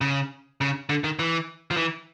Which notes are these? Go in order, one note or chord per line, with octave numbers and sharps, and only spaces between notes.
C#3
C#3
D3
D#3
E3
F3
E3